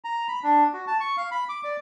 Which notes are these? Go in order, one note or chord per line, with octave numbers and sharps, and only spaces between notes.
A#5
B5
D4
F#4
A5
C#6
F5
B5
D6
D5